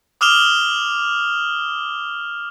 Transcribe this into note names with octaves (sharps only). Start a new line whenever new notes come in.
D6 D#6 F6 E7 F7 G7